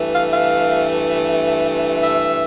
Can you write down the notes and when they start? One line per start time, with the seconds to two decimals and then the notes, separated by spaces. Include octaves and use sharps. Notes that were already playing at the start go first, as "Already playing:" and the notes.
Already playing: G2 E3 A3
0.13 F5
0.32 F5
2.03 E5